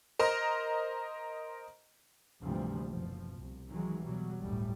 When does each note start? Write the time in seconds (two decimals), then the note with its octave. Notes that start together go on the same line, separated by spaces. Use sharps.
0.19 A#4 C5 D#5 A#5
2.41 D2 G#2 C3 E3 F3 G3
2.86 F#1 B2 F3
3.38 C2
3.69 D#3 E3 F#3 G#3
4.03 E2 B2 F#3 G3
4.40 G1 D2 A2 G3 A3